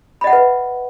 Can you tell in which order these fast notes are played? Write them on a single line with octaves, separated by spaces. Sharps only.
B5 D#5 F#5 E5 B4